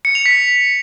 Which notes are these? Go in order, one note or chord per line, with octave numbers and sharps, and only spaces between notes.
C#7
F7
B6